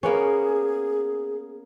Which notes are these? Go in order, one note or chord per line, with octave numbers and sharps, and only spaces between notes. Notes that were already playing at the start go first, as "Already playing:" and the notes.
A#3 B3 C#4 G#4